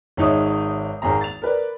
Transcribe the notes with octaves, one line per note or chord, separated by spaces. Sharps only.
G#1 G#3 D#4 C#5 E5 D#6
G#1 D#3 G#4 A#5
A6 F7
A#4 B4 D5